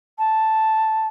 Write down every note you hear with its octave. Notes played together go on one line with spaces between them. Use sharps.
A5